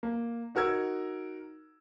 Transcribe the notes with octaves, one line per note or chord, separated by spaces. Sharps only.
A#3
D#4 F#4 A#4 E6 G#6